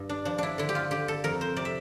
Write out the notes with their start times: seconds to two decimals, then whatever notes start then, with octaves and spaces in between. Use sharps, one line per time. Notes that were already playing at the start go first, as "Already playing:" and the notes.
Already playing: G2
0.09 D4
0.25 F3 D4
0.38 D4 E4
0.58 D3 E4
0.69 G4
0.75 F4
0.91 D3 G4
1.08 A4
1.24 F2 A#4
1.41 C5
1.56 C3 D5
1.65 E5